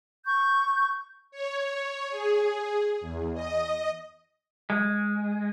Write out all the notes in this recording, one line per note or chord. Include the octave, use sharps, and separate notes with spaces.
C#6 G6
C#5
G#4
E2
D#5
G#3